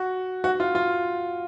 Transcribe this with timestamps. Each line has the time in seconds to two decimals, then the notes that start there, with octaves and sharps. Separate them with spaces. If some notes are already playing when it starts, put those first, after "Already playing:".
Already playing: F#4
0.44 F#4
0.60 F4
0.75 F4